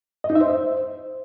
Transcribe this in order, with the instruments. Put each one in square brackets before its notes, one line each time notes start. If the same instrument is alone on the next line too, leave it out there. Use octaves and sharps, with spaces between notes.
[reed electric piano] D#5
D#4
E5
C5